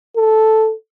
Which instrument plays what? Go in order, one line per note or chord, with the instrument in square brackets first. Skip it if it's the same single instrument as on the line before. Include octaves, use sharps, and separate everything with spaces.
[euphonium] A4